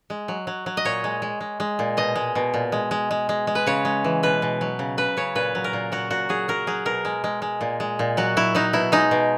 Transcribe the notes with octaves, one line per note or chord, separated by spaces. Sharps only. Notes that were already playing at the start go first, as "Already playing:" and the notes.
G#3
F#3
F#3
F#3
D#5
A#2 C#5
G#3
G#3
G#3
G#3
A#2
B2 D#5
G#3
B2
A#2
G#3
G#3
G#3
G#3
G#3
B4
C#3 C#5
G#3
E3
B2 B4
B2
F#3
C#3
C#3 B4
C#3 C#5
A#2 B4
F#3
A#4
A#2
F#3 F#4
A#2 F#4
F#3 G#4
F#3 A#4
F#3 G#4
B2 A#4
G#3
G#3
G#3
A#2
G#3
A#2
F#3 F#4
F#3 E4
F#3 D#4
B2 E4
G#3 D#4
B2